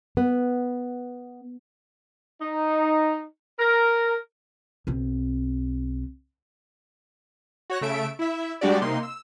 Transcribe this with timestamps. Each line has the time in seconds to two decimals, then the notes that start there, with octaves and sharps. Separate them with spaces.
0.17 B3
2.41 D#4
3.60 A#4
4.87 B1 C4
7.70 F#4 C#5 F#6 A#6
7.81 C#3 A3 E5 D7
8.19 E4 E5
8.61 G3 G#3 D4 F#4 G4 D5
8.81 C3 A#3 D#4 C6
9.03 E6